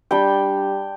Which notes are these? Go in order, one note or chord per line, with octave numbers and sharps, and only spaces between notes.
G3 D4 G5